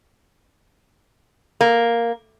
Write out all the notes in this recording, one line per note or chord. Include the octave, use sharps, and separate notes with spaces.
A#3